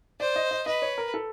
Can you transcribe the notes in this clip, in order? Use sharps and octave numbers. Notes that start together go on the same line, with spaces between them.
C5 D5
D#5
D#5
B4 D#5
C#5
A#4
A4